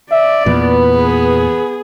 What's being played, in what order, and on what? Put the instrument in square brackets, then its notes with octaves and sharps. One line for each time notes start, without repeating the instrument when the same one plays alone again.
[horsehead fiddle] D5 [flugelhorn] E5
[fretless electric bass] E2 A#2 [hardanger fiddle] B3 [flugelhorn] B4
[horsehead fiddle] G#4